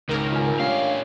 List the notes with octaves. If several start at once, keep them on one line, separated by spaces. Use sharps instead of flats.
C#2 G#2 D#3 A#4
F4 G#5
A3 C#4 D4 G4 C#5 F5